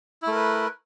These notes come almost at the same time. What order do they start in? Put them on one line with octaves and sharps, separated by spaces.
E4 A3 A#4 B4